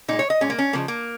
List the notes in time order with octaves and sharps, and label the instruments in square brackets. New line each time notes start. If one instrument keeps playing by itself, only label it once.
[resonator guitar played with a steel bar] A#2 G#3 D#4
C#5
D#5
A#2 G#3 C#4
A#3
C#4
C#3 F3 G#3 A#3
A#3